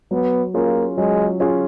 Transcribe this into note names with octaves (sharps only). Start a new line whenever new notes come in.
F#3 B3
A#3 C#4 F4 G#4
F#3 G#3
C#4 F4 G#4